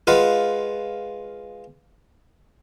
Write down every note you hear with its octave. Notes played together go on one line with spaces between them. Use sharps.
G#3 F4 B4 F5 F#5